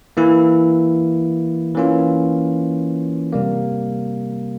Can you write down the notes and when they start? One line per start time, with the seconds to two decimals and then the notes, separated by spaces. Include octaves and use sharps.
0.17 E3 A#3 E4
1.75 E3 A#3 C#4 F4
3.33 C3 G3 A#3